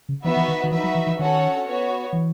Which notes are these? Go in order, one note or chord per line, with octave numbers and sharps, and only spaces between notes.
C#3
E3 B3 D#4 F#4 B4 E5
E3
D#3
D#3
E3 D#4 F#4 B4 E5
F#3
E3
E3
D#3 C#4 F#4 A4 C#5 F#5
B3 F#4 C#5
E3